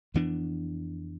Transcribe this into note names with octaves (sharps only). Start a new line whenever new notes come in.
F2 E3 B3 D4